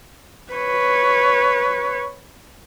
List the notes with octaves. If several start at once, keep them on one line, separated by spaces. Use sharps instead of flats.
B4 C#5